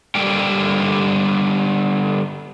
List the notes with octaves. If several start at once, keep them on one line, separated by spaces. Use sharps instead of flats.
D3 G3 A#3 D4 G4 G5